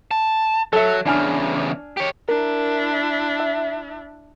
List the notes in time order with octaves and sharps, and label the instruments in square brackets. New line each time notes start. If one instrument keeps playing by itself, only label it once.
[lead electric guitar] A5
[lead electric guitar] F#3 [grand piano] A4 E5
[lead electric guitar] E2 C#3 [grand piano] D4 G#5 F6
[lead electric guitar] G4 C#5
[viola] D4 E4 [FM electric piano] A#4
[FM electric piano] E5